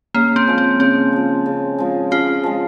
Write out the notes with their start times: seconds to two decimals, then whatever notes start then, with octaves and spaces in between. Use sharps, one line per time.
0.14 C#3 A#3
0.36 C4
0.47 F3 G#3
0.58 C4
0.80 C#3 C4
1.13 F3 G#3
1.46 C#3
1.79 F3 G#3
2.11 C#3 F4
2.44 F3 G#3